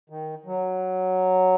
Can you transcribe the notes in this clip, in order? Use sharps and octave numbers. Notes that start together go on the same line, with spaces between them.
D#3
F#3